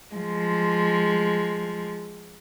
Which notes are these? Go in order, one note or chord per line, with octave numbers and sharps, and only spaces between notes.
F3 G#3